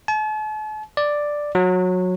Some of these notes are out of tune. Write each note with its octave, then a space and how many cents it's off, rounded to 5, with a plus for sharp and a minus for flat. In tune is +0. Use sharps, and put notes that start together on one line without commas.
A5 -45
D5 +5
F#3 -20